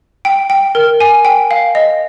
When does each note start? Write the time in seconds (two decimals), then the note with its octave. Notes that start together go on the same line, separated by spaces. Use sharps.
0.25 G5
0.50 G5
0.75 A#4
1.00 G#5
1.25 G5
1.51 F5
1.75 D#5